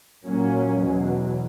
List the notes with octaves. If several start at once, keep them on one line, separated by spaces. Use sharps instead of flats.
A#2 F#3 A#3 C#4
E2 B2 F#3